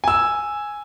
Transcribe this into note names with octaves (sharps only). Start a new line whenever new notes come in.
G#5 E6